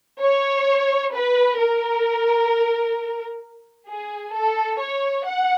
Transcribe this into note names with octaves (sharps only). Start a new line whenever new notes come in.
C#5
B4
A#4
G#4
A4
C#5
F#5